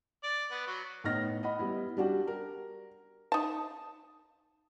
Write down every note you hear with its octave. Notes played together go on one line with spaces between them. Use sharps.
D5
B3
F#3
A2 B3 D#4 F6 A#6
D#5 F#5 B5
G3 B3 E4
G3 D4 F#4 G4
A#4
D#4 A5